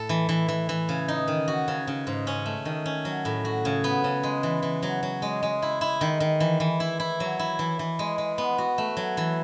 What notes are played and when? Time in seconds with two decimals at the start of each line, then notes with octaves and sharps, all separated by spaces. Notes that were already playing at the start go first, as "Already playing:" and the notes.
Already playing: A2 A4
0.09 E3
0.29 E3
0.48 E3
0.69 E3
0.89 C#3
1.08 D#4
1.28 D#3
1.48 F#4
1.68 C#3
1.87 C#3
2.07 G#2
2.27 C#4
2.46 A3
2.65 D#3
2.86 C#4
3.05 F#3
3.25 A2
3.45 F#4
3.65 C#3
3.84 B3
4.04 C#3
4.23 G#3
4.43 E3
4.63 E3
4.83 F#3
5.03 F#3
5.22 G#3
5.43 G#3
5.62 E4
5.81 E4
6.01 D#3
6.20 D#3
6.40 E3
6.60 E3
6.80 E4
7.00 E4
7.20 F#3
7.39 E4
7.59 E3
7.79 E3
7.99 G#3
8.18 G#3
8.38 B3
8.58 F#4
8.78 A3
8.97 F#3
9.17 E3